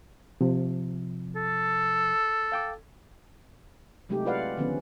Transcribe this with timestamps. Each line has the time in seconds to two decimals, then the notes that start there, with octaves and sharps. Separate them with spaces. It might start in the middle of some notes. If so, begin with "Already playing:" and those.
0.41 C3 F3
1.36 A4
2.52 F5 G5 D6
4.09 C3 F#3 G#3 A3 D#4 G4
4.25 E4 F4 B4 D5 F5 F#5
4.57 D3 D#3 F3 B3 C#4